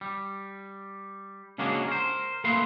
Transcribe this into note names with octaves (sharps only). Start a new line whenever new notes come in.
G3
C#3 G#3 A#3 D4 F#4 G#4
A#4 C5
A3 A#3 B4 C6